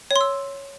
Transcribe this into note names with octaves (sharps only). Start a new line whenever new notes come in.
C#5
C6
E6